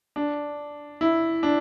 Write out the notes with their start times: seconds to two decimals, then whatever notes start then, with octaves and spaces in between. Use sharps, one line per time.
0.16 D4
1.01 E4
1.43 D4